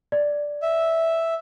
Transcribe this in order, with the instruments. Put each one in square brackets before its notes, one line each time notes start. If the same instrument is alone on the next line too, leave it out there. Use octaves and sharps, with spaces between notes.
[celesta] D5
[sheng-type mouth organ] E5